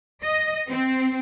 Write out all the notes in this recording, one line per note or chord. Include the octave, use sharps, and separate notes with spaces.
D#5
C4